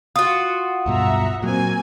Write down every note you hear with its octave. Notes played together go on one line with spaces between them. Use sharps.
F4 F#4 D#6
D1 G2 B2 E5 F#5 A#5
A#2 F#3 A#3 C4 G#5